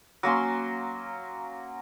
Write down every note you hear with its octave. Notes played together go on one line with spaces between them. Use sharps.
F#3 A#3 C#4 C6